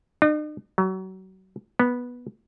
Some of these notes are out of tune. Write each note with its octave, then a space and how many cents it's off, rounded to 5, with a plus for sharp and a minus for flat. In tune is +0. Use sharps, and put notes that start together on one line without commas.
D#4 -45
F#3 +30
B3 -10